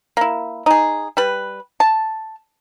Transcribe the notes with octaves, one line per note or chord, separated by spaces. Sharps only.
A#3 E4
D#4 G#4
G3 B4
A5